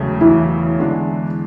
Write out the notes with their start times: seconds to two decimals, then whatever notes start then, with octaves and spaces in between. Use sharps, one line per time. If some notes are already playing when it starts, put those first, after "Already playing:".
Already playing: E1 E2 C#3 F#3 A3
0.21 E3 E4
0.78 E2 D3 G#3 D4